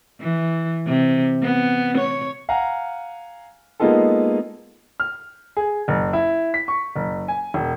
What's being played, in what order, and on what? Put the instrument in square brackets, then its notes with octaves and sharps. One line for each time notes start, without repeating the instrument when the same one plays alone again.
[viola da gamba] E3
C3
B3
C#5
[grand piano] F5 F#5 G#5 A#5
G#3 A#3 B3 D#4 F4 A4
F6
G#4
F#1
E4
B6
C#6
F#1
G#5
E1